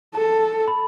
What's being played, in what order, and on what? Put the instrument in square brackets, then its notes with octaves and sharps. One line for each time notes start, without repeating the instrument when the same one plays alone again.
[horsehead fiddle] A4 [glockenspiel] A5
[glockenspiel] B5